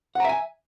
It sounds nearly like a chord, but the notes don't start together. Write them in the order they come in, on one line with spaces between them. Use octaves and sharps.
F#5 A#5 E5 G#5